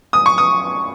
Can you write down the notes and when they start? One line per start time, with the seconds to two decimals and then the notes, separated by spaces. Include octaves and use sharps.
0.13 D#6
0.26 C#6
0.38 D#6